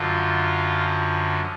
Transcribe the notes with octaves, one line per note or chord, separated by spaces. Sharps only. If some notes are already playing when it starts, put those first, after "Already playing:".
Already playing: F#2 D3 F3 F4